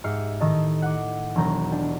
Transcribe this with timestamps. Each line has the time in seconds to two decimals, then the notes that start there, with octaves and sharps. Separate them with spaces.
0.04 G#2 G4 E5 F6 C7 C#7
0.41 A2 D#3 A4 D#5
0.82 F#5 D6
1.36 E1 D#3 F#3 A#5 G6
1.72 D4 G4 G5